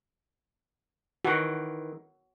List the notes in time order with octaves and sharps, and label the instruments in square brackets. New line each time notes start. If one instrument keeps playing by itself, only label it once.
[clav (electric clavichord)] D#3 E3 [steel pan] F#4